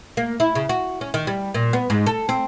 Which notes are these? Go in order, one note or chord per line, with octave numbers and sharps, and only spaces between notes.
A#3
E4
C#3
F#4
C#4
D#3
G3
A#2
B3
G#2
A4
C4